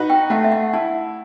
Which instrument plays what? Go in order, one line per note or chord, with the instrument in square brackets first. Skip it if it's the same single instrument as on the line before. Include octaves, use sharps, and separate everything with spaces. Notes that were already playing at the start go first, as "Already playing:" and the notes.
Already playing: [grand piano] D#4 F#4 B4
[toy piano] G5
[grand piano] A3 [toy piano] F#5
[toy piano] E5
F#5
[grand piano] E4 [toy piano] A5